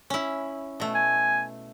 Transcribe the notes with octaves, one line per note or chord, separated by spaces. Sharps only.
C#4 E4
B2 A3
G#5